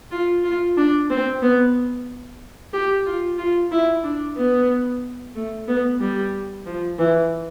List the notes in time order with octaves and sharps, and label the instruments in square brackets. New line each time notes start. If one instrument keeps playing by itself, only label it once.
[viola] F4
F4
D4
C4
B3
G4
F4
F4
E4
D4
B3
A3
B3
G3
F3
E3